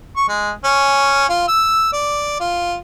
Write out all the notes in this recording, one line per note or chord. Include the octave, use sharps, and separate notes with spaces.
C#6
G#3
C#4
F4
E6
D5
F4